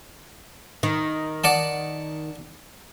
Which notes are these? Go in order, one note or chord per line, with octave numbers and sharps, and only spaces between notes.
D#3
D5 F#5 A5